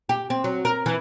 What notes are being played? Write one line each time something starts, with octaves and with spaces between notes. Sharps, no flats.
G4
C4
F#3
A#4
E3